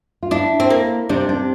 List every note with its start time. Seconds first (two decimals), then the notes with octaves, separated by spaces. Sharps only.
0.23 F4
0.31 D4 E4
0.60 C4
0.70 A#3
1.09 C3 D4
1.29 D4